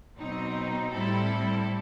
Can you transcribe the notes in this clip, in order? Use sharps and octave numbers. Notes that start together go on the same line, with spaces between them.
B2 F#3 C4 D#4
A2 G3 C4 E4 A4